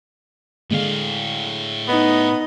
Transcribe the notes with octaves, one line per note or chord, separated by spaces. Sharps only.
A2 D3 G#3 F5
B3 D#4 D#5